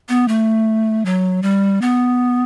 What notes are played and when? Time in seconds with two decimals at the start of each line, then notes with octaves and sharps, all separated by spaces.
0.09 B3
0.28 A3
1.05 F#3
1.42 G3
1.82 B3